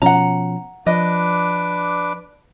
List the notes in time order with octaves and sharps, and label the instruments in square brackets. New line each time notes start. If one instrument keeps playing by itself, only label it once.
[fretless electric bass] B2 F3 C#4 [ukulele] F#5 A#5
[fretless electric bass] F3 [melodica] D4 B4 D6 [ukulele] D#5